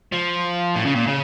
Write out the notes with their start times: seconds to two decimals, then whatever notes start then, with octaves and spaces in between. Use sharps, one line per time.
0.12 F3
0.75 A2
0.86 C#3
0.95 A#2
1.07 C#3